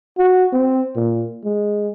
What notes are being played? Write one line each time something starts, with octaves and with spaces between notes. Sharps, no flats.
F#4
C4
A#2
G#3